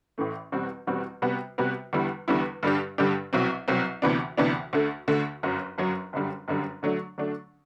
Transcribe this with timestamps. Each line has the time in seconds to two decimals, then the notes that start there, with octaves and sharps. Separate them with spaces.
0.18 A1 A2 E3 A3
0.52 E2 B2 G3 C4 F#4
0.87 E2 B2 G3 C4 F#4
1.22 C3 G3 B3 F#4 B4
1.58 C3 G3 B3 F#4 B4
1.93 E2 D3 G3 B3 E4
2.28 E2 D3 G3 B3 E4
2.63 G2 D3 G3 D4 G4
2.98 G2 D3 G3 D4 G4
3.33 C2 B2 F#3 C4
3.68 C2 B2 F#3 C4
4.02 D2 C3 E3 B3 D4
4.37 D2 C3 E3 B3 D4
4.73 D2 D3 A3
5.08 D2 D3 A3
5.43 G1 F#2 F#3
5.78 G1 F#2 F#3
6.13 G1 F#2 D3 G3
6.48 G1 F#2 D3 G3
6.83 D3 F#3 A3 D4
7.18 D3 F#3 A3 D4